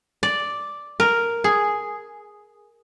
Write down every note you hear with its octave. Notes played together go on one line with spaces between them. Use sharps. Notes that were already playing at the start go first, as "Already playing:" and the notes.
D5
A#4
G#4